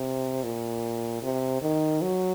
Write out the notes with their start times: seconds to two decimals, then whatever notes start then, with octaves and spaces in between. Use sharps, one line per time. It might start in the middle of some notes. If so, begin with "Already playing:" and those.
Already playing: C3
0.43 A#2
1.23 C3
1.62 D#3
2.02 F#3